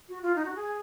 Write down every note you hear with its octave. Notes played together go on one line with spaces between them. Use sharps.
F#4
F4
D#4
F#4
G#4